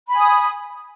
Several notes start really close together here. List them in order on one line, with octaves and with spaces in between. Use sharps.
B5 G#5 D#6